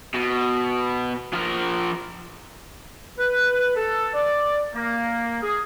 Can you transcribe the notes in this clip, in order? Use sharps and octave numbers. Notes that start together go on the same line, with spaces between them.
B2
F3 A#4
B4
A4
D5
A#3
G#4